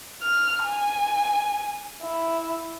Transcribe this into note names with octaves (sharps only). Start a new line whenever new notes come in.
F6
G#5
E4